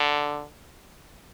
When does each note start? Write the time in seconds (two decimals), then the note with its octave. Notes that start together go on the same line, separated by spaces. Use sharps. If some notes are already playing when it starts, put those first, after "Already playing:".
Already playing: D3